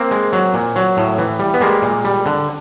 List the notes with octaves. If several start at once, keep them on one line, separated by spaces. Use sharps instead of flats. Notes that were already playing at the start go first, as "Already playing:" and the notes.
Already playing: A#3 C4
G#3
F#3
A#2
F#3
A2
E3
G3
B3
G3 G#3 A#3
A#2
G3
D3